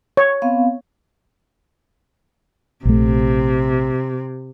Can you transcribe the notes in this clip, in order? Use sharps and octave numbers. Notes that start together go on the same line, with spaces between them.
C#5
B3 C4 F5
A#1 C3 A3